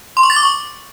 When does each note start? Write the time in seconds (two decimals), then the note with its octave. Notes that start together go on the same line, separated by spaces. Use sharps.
0.17 C6
0.23 C#6
0.30 A6
0.36 D6
0.43 C#6